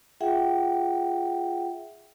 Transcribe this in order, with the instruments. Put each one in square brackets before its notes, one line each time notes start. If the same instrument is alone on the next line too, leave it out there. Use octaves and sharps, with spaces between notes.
[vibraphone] F4 G#4 E5 F#5 G5